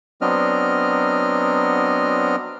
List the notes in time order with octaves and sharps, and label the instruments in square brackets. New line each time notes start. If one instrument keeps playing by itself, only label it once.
[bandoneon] F#3 B3 C4 D4 D#5 F6